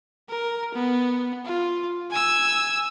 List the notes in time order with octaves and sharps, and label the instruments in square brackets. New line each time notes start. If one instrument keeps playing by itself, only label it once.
[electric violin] A#4
B3
F4
G#5 E6